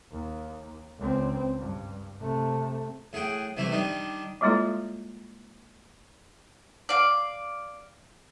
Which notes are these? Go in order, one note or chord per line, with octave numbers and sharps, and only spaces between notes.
D#2
C#2 C4
G2
C3 A3
A2 G#4 F#5 G5
C3 E3 G3 A3 E4
D#3 G3 D4 D#4
G3 G#3 A#3 E4 F4 A4
D5 F5